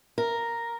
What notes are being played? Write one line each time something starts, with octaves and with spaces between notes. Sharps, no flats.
A#4